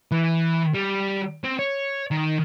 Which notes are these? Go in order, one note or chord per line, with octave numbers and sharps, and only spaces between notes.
E3
G3
C4
C#5
D#3